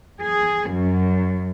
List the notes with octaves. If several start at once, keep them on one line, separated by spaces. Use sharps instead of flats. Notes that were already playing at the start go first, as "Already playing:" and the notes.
G#4
F#2